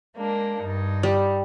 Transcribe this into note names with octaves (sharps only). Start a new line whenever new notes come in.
G#3 A#3 D4
G2 D#4
G3